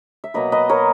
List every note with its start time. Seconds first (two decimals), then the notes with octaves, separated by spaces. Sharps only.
0.24 E5
0.34 B2 F#3 A#3 B4 D#5
0.52 B4 D#5
0.69 A#4 C#5